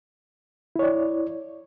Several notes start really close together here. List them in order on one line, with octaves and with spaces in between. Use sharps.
E4 C#5 D5